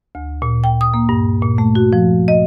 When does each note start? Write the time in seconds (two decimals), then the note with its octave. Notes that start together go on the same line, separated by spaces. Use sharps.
0.15 D2
0.42 A#2
0.64 G5
0.81 D#6
0.94 A#3
1.09 G2
1.42 A#2
1.58 A3
1.75 F#4
1.93 F3
2.28 D#5